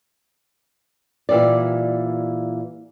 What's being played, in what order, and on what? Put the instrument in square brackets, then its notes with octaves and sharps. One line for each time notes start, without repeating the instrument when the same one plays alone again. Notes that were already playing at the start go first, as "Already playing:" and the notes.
[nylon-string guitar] A#2 E3 G3 D5